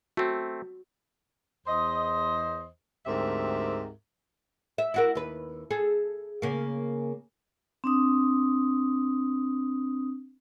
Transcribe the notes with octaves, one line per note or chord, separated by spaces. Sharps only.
A3 C4 F#4
E2 C5 D#5
D2 G#2 C4 G4 A#4 E5
E5
E4 F#4 A#4
D#2 B4
G#4 A4
C#3 A#3
C4 D4 D#6